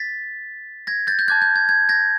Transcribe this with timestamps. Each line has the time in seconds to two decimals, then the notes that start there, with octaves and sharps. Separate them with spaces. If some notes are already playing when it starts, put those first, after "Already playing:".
Already playing: A6 B6
0.87 G#6 A#6
1.07 G6 A6
1.19 G6
1.28 A5 D6 F#6 G#6
1.42 G6
1.56 G#6
1.69 G#6
1.89 G#6 A#6